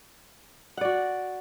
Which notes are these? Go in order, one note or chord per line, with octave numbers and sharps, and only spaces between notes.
F#4 D5 F#5